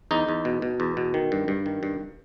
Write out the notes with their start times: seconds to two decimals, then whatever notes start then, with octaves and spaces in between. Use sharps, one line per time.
0.11 E2 D#4
0.29 E2
0.45 B2
0.62 B2
0.80 E2
0.97 B2
1.14 D#3
1.32 G2
1.48 G2
1.66 D#3
1.83 G2